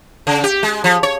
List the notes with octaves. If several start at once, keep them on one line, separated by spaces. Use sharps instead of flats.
C#3
G4
G#3
F3
C#5